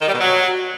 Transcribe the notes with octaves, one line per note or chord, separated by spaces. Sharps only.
D#3
G3
B2
F#3